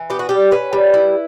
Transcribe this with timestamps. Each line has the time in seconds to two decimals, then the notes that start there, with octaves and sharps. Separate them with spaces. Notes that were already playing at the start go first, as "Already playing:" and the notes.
Already playing: E3
0.10 B3 G4
0.19 F#4
0.29 G3 G4
0.51 C#4 B4
0.73 G3
0.94 E4